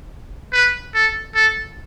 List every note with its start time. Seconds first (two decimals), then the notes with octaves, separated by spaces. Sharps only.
0.53 B4
0.95 A4
1.35 A4